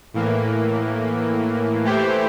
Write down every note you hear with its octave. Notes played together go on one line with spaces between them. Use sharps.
A2 E3 A#3
E3 A3 E4 G4 C5